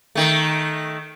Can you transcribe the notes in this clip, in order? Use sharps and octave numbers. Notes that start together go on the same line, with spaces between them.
D#3 A3